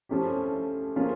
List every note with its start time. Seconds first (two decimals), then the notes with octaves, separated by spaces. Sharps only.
0.09 F3 A3 C#4 E4 G4
0.96 F3 A#3 C#4 F4 G#4